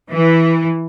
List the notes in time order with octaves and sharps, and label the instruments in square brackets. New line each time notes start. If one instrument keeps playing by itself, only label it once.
[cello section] E3